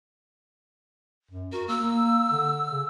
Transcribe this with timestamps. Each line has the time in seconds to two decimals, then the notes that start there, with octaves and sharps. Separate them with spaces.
1.31 F#2
1.52 F#4 A#4
1.68 A#3 E6
1.83 A#3
2.31 D3
2.71 C#3